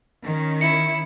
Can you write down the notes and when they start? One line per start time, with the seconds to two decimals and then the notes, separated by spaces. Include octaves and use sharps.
0.23 D#3 C#4
0.61 E4 C#7